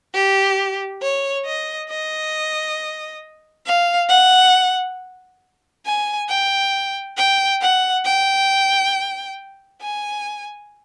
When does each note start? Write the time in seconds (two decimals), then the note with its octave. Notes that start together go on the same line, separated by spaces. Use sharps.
0.14 G4
1.01 C#5
1.45 D#5
1.90 D#5
3.66 F5
4.09 F#5
5.86 G#5
6.29 G5
7.17 G5
7.61 F#5
8.05 G5
9.81 G#5